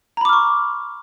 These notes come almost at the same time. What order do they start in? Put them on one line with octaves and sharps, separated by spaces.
A#5 B5 D6 F6 C#6